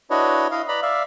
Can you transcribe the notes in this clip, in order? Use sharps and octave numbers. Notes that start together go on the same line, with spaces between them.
D4 E4 F#4 B4 C#5 D#5
E4 D#5 F5
B4 D5 A#5 B5
D5 E5 F5